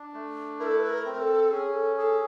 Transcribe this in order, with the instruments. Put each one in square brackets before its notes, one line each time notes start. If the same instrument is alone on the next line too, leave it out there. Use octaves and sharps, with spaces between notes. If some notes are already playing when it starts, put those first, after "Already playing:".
Already playing: [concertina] D4
A3
[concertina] E4 [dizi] A#4
[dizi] A4
B4
A#4
[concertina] C4
[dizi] A4
[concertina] C#4 [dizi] G#4
[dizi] A4
[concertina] G#4 [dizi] A4